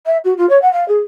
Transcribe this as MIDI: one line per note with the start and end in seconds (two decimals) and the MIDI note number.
0.06 0.17 76
0.24 0.34 66
0.37 0.48 65
0.49 0.61 73
0.62 0.71 78
0.73 0.87 77
0.88 0.99 68